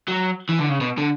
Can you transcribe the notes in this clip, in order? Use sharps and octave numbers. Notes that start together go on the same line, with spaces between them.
F#3
E3
D3
C#3
B2
D3